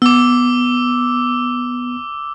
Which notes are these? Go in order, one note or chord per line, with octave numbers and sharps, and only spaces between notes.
B3 D6 E6